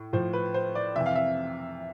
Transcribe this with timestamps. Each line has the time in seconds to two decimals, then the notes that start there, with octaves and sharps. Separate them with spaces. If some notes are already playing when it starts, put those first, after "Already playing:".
Already playing: A2
0.13 A2 F3 C5
0.33 B4
0.54 C5
0.75 D5
0.96 F2 C3 E3 E5
1.06 F5
1.16 E5